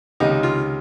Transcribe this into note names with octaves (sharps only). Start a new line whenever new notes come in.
C#2 C3 D#3 D#4
F4